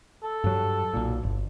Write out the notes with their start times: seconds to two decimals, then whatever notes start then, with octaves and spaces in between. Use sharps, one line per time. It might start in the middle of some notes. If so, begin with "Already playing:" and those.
0.23 A4
0.44 G2 F#3
0.94 B1 A#2
1.23 G1